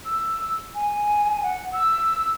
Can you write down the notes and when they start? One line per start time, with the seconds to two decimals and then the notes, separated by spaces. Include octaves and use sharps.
0.05 E6
0.75 G#5
1.43 F#5
1.72 E6